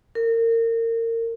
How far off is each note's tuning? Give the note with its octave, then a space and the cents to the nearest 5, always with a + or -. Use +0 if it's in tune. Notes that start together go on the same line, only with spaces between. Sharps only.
A#4 -30